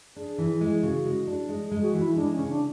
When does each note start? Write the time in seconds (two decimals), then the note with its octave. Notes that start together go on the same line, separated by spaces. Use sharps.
0.16 D4 G#4
0.38 E3
0.61 G#3
0.83 C#3 F#4
1.05 G#3
1.27 D4
1.49 G#3 G#4
1.66 G#4
1.71 G#3
1.82 F#4
1.93 E3
2.00 E4
2.16 G#3 D4
2.32 C#4
2.38 C#3
2.49 D4